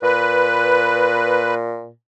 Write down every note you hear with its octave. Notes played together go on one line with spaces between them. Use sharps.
A#2 B4